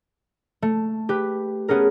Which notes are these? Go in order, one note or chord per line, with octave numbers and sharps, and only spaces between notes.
A3
G4 B4
A3 B3 C#4 G#4 A#4